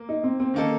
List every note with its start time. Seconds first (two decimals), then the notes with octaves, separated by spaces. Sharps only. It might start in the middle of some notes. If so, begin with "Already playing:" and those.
Already playing: A#3
0.09 D#4
0.24 C4
0.40 C4
0.54 D#3 A#3 C#4 D#4 A4